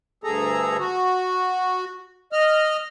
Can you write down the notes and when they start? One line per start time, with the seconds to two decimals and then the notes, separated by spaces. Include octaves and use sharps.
0.24 D2 G2 G#4 A4 A#5
0.79 F#4
2.32 D#5 F6